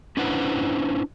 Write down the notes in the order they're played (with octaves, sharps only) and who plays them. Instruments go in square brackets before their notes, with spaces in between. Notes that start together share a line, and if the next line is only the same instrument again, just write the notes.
[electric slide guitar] C#4 D4 E4 B4 C5 F#5